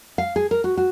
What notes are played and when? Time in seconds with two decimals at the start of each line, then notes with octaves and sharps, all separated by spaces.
0.18 F5
0.36 G#4
0.51 A#4
0.64 F#4
0.77 F#4